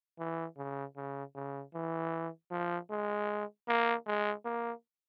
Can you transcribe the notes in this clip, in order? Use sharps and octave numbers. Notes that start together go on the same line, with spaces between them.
E3
C#3
C#3
C#3
E3
F3
G#3
A#3
G#3
A#3